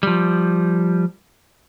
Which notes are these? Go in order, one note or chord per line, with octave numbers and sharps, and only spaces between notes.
F3 G3